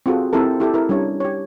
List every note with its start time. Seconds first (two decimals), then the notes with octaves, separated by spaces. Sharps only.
0.06 C4 F4 F#4 G#4 A4
0.33 C4 E4 G4 A4 A#4
0.60 E4 G4 A4
0.74 E4 A#4
0.89 G3 C#4 D4 C#5
1.20 G4 C#5